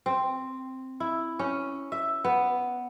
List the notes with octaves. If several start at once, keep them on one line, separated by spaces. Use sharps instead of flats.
C4
E4
C#4
E5
B3